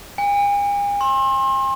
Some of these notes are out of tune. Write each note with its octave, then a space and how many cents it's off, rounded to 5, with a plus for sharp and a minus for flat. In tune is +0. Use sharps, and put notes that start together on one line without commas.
G#5 -45
C6 +35